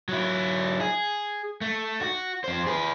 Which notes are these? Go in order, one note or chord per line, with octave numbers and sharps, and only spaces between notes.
F#3 E4
G#4
A3
F#4
F2 C5
G#4 B4